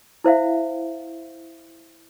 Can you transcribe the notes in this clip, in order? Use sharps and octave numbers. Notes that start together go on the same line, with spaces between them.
E4 C5 E5 F5